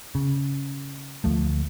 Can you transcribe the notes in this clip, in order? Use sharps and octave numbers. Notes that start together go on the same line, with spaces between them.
C#3
D2 F3 A3